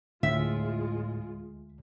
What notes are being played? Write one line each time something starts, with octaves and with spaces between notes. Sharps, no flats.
D2 A2 G#3 F4 E5